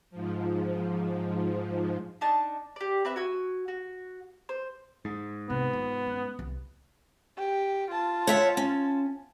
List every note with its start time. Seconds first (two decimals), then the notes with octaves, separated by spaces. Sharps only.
0.11 G#2 F3
2.21 D4 D#4 A5
2.76 G4 D5
3.05 C4 B4 E5
3.16 F#4 G#5 E6
3.68 F#4
4.49 C5
5.05 G#2
5.50 C3 B3 C4
5.73 F4
6.06 C#4
6.39 C2
7.38 G4
7.91 F4 A5
8.27 C#5 E5 F#5
8.57 C#4